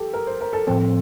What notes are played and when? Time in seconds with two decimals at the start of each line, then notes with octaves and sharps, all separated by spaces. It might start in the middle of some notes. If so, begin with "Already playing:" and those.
Already playing: G4 A4
0.13 A#4
0.27 C5
0.41 A#4
0.53 A4
0.67 A2 F3 C4 A4